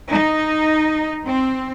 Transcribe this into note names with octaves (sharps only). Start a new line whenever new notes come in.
D#4
C4